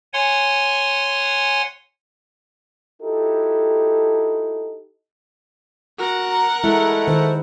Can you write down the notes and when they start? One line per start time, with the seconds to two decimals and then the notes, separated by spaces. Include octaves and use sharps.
0.13 C#5 F#5 G#5 C6
3.03 D#4 E4 F#4 G4 A4
5.99 F#4 A#4 F#5
6.31 A#5
6.64 G#3 A3 E4
7.08 D#3 C5